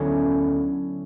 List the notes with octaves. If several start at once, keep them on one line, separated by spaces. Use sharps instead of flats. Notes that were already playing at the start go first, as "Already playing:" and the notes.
Already playing: D2 D3 F#3 B3 C#4 E4